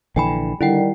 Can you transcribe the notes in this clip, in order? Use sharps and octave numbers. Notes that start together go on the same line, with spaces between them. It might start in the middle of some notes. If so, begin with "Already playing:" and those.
A#1 D3 E3 G5 G#5 B5
D3 D#3 G3 E4 F#5 G5